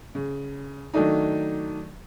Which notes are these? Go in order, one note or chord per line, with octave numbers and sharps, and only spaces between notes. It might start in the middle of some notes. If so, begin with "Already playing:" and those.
C#3
D#3 F#3 A3 D4 D#4